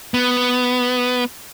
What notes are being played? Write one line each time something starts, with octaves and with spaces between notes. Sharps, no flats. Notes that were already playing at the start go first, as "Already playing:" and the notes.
B3